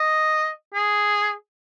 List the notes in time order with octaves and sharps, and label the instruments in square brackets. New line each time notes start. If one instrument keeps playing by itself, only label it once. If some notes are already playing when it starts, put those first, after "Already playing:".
Already playing: [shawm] D#5
G#4